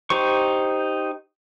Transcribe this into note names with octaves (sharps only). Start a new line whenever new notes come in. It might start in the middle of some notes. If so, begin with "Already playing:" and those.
D#4 G4 C5 C#6